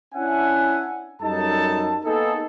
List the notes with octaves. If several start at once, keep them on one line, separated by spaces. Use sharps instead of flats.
C#4 D4 E4 E5 F#5 G#5
F#2 G3 D#4 A4 A5
A#3 B3 D#4 G#4 A4